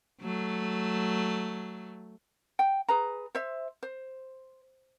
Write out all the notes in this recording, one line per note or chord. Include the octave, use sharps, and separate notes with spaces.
F#3 A3
G5
G#4 B4 A#5
C5 E5
C5